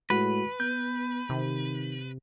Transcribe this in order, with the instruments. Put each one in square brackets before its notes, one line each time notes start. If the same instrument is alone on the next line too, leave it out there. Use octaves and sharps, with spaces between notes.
[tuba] A2 [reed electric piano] G#3 F#4 [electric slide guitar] B4
[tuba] B3 [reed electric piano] G6
[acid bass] C3 [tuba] D#3